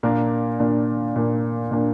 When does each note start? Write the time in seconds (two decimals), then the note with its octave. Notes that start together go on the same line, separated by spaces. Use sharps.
0.03 A#2 A#3 D4 A#4
0.59 A#2 A#3 D4
1.16 A#2 A#3 D4
1.71 A#2 A#3 D4